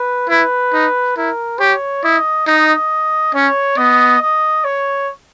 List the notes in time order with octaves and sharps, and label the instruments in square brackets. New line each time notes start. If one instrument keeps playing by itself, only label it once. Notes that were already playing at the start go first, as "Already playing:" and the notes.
Already playing: [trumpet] B4
[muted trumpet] E4 [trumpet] B4
[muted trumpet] D#4
[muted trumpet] E4 [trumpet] A#4
[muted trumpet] G4 [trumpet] C#5
[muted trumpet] E4 [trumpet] D#5
[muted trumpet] D#4 [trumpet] D#5
[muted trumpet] C#4 [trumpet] C#5
[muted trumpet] B3 [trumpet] D#5
[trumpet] D#5
C#5